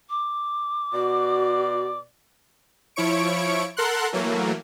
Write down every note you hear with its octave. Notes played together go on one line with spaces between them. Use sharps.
D6
B2 F#4 D5
F3 E4 C#5 C#6 D7
A4 A#4 F#5 C6 F#6
E3 F#3 A3 A#3